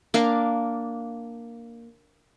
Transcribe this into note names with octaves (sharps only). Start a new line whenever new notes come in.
A#3 D4 F5